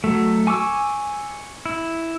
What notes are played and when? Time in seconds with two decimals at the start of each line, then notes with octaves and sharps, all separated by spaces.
0.04 F#3 A3
0.47 G#5 C#6 D6 E6
1.66 E4